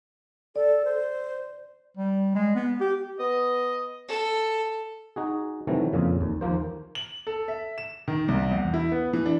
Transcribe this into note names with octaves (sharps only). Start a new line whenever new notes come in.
A4 D5
C5
G3
G#3
B3
G4
B3 D#5
A4
D#4 F#4 G#4
C3 D#3 E3 F#3 A3
F2 A#2 C#3
D#2
D#2 F3 A#3 C5
F#7
A4
E5
E7
D#3
C2
E2
E4
B3
E3
D4